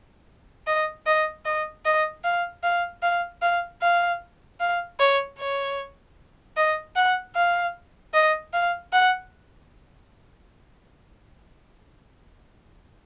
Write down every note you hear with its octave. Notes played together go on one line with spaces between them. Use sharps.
D#5
D#5
D#5
D#5
F5
F5
F5
F5
F5
F5
C#5
C#5
D#5
F#5
F5
D#5
F5
F#5